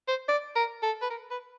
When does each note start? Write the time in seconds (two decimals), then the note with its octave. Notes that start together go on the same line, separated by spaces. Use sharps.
0.08 C5
0.28 D5
0.56 A#4
0.83 A4
1.02 B4
1.10 A#4
1.31 B4